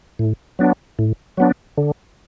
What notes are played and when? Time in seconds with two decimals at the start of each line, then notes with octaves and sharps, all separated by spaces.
0.19 A2
0.59 F#3 B3 D4
0.99 A2
1.37 F#3 B3 D4
1.78 D3